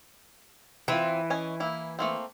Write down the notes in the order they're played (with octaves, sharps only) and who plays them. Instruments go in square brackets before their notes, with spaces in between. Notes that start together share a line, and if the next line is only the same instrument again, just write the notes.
[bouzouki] E3 [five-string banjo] C4 F4
[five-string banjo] C#4 D#5 G#5
A#3 E4
A3 A#3 C4